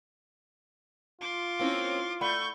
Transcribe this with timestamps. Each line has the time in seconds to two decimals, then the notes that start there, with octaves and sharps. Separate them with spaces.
1.21 F4 C6 D6
1.60 A#3 C4 C#4 E4 F5
2.21 A3 D5 F#5 B5 C#6 G6